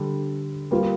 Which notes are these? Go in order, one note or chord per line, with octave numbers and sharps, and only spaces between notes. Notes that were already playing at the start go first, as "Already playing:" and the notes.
Already playing: D3 G3 D4
G3 A#3 F4